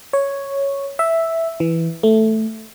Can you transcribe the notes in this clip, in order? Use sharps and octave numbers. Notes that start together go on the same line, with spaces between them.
C#5
E5
E3
A3